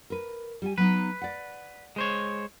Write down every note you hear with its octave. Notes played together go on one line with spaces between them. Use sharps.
A#4 B4
G3 G4 G#5
F#3 B3 D#4 B4
D5 F#5
G#3 C5 C#5